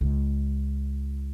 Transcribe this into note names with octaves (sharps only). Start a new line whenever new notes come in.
C#2